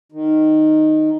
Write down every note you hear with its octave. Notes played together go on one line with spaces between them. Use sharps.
D#3